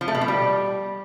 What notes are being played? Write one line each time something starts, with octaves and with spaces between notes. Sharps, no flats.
F3
A3
B2
F3
G3